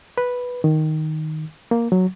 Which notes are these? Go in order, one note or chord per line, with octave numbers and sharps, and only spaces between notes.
B4
D#3
A#3
F#3